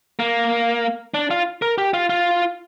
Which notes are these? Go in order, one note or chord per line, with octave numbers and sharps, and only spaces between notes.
A#3
D4
F4
A#4
G4
F4
F4